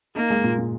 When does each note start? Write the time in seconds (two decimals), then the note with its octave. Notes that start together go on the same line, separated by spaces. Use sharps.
0.16 A#3 D#4
0.30 G#3
0.44 A#2
0.58 A#2